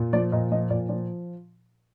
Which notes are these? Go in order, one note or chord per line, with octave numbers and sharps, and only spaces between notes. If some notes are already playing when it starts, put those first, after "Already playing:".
Already playing: A#2
F3 D5
A#2 D#5
F3 D#5
A#2 D5
F3 D5